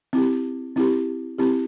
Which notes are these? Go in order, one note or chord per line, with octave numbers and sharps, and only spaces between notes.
C4 E4 G4
C4 E4 G4
C4 E4 G4